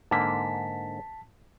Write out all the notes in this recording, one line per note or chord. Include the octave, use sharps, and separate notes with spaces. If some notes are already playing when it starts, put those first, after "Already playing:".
G#2 D3 A#3 A5 B6